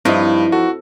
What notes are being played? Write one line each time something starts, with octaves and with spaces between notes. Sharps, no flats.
G2 E3 F3 C4 D#4 E4 D#5
F#4 A4